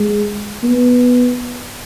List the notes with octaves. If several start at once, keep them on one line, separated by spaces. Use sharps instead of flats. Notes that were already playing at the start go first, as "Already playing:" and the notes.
Already playing: G#3
B3